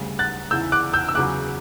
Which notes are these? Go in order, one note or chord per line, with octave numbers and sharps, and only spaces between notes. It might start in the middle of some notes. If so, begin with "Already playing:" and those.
Already playing: D2 C#3 G3
F#6 A6
E2 C#3 E3 E6 G6
D6 F#6
E6 G6
E6
E2 C#3 F#3 D6 F#6